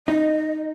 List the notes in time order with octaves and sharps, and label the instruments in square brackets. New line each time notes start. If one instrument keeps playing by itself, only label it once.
[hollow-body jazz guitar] D#4 [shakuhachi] D#5